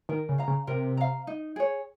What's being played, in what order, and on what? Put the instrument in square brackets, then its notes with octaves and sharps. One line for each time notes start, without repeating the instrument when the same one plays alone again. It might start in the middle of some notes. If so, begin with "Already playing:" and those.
[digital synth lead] D#3 [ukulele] A#4
[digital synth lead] C#3
[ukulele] F5 A#5
[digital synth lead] C#3
[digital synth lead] C3 [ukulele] A#4
[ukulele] F5 A#5
D#4
G#4 C#5